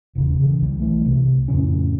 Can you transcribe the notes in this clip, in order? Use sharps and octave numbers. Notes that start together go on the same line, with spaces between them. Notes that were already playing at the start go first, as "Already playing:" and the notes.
E1 A1 D#2 C#3
C#3 E3
C2 F3 G3
A#1 E3 A3
C2 C3
F2 A2 C#3 C#4